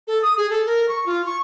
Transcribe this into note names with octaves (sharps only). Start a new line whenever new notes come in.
A4
D#6
G#4
A4
A#4
C#6
F4
C#6